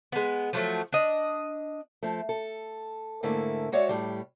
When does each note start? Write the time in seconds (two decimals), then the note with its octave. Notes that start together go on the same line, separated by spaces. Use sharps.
0.12 G#3 B3
0.53 F3 F#3 A3
0.93 D4 D#5
2.03 F3 A3
2.29 A4
3.23 G#2 D3 A3 A#3 E4
3.72 G#3 F#4 C#5 D5 E5
3.89 A2 G3